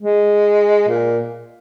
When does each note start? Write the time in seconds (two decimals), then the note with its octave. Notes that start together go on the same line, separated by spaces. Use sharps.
0.02 G#3
0.88 A#2